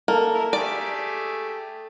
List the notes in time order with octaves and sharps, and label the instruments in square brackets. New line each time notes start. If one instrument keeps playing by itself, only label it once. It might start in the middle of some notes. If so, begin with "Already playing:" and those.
[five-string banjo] A#3 [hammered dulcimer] A4
[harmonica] E4 A#4
[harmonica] A3 G4 G#4 [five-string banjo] D5